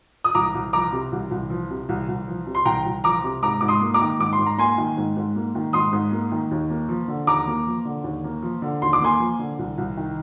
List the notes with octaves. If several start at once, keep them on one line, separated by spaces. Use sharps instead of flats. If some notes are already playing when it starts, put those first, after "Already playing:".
D#6
C2 A#5 D6
C2
F3 A#5 D6
C3
C2
C2
F3
C3
C2
C2
F3
C3
C6
C2 G5 A#5
C2
F3 A#5 D6
C3
G#2 A#5 D6
G#2 D6
C6 D#6
A#3
A#5 D6
D#3
G#2 D6
C6
G#2
A#5
A#3 G#5 C6
D#3
G#2
G#2
A#3
D#3
G#2 C6 D#6
G#2
A#3
D#3
D#2
A#3
F3
D3
D#2 A#5 D6
A#3
F3
D3
D#2
A#3
F3
D3
D#2 C6
D6
A#3 G#5 C6
F3
D3
C2
C2
D#3